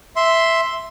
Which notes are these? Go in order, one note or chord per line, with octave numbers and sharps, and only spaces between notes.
E5 C6